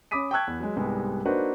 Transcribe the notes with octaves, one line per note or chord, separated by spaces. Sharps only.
C#4 B5 D6 D#6 B6 D#7
G5 A5 C#6 E6 F#6 G#6
E2
F#3 G#3
C2 G#2 G3 G#3 B3
A#3 D4 D#4 F#4 B4 C5